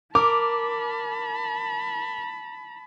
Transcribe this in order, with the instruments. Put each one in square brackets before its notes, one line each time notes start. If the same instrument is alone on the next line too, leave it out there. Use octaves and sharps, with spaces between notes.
[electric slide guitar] A#4 [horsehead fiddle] A5 B5 [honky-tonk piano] D6